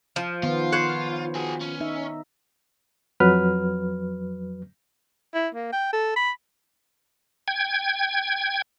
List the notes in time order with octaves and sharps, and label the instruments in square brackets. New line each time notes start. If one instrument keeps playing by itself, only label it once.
[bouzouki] F3
[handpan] D#3 B3 [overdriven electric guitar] F4
[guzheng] C5 C#5 F#5
[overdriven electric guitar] F#4 G#4
C#4
[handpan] D#4 E5
[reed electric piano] F2 F#3 B4 F6
[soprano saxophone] E4
A#3
G5
A4
B5
[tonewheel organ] G5 G#6